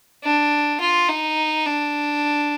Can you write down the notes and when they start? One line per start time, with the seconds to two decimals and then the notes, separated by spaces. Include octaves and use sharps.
0.24 D4
0.80 F4
1.09 D#4
1.66 D4